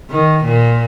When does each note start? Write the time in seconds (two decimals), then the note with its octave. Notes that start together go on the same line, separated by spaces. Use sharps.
0.10 D#3
0.44 A#2